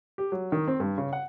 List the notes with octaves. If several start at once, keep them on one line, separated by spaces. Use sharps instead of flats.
G4
F#3
D#3
C4
G2
C#3
F#5